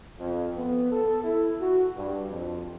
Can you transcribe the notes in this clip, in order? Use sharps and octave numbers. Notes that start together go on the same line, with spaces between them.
F2
B3
A4
E4
F#4
G2
F2